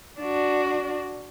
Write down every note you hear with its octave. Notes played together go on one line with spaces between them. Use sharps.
D4 F#4